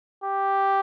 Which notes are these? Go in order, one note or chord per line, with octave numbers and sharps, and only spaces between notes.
G4